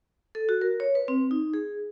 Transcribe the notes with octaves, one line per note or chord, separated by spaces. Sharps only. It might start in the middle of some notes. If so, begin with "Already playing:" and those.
A4
F#4
A#4
C#5
B4
C4
D#4
G#4